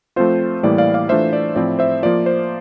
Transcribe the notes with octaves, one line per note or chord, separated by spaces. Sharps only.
F3 A3 C4 F4 C5
A2 E3 G3 A#3 D5
D5 F5
D5 F5
E3 A3 D4 F4 C5 E5
D5
A2 F3 C4 E4 D5
C5 E5
F3 A#3 F4 D5
C5